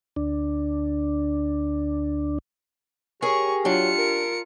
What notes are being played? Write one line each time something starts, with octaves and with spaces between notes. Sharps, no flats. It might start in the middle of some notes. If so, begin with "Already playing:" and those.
D2 D4
G4 G#4 A#4 C#5 G#5 C#6
F#3 D4 F4 C#7
A#4